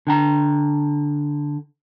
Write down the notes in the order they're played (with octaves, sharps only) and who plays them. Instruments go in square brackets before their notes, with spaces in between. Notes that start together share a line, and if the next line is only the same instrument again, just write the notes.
[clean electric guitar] D3 G5 A#5